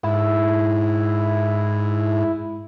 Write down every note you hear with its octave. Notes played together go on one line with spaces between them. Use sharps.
G#2 E4